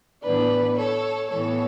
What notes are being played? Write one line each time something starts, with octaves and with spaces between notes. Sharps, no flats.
A2 E3 B3 D4 B4 D5
A4 C#5
A2 E3 B3 A4 C#5